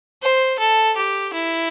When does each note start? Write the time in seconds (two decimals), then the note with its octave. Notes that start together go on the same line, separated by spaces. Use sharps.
0.23 C5
0.59 A4
0.97 G4
1.34 E4